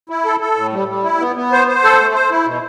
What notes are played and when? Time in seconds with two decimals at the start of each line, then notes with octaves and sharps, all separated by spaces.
0.09 E4
0.25 A4
0.40 A4
0.56 A2
0.73 G3
0.88 G3
1.04 E4
1.20 B3
1.36 B3
1.52 C5
1.68 C5
1.83 A4
1.99 A3
2.14 C5
2.31 E4
2.46 B2